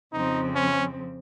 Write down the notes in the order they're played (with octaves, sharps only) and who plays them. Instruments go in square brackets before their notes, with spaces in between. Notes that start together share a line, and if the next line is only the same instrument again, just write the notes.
[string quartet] F2 C#3 F3 C4 [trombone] D#4
[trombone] C#4